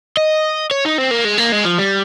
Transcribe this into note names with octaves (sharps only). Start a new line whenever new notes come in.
D#5
C#5
D#4
C4
A#3
G#3
A#3
G#3
F3
G3